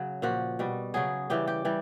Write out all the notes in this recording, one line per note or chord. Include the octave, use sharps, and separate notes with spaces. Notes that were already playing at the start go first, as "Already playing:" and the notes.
Already playing: C#3 F#3
A#2 F3 F#4
B2 G3
C#3 F#3 G#4
C#3 E3 G3 G4
G4
E3 G3